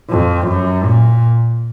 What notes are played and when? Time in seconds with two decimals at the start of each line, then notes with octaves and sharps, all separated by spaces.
0.10 F2
0.48 F#2
0.84 A#2